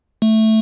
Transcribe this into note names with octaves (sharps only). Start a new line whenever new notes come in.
A3